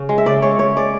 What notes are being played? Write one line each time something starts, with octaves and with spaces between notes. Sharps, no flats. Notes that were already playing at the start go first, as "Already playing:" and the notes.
Already playing: C#3
G#3
E5
C#3 D5
G#3 C#5
C#3 C#5
G#3 D5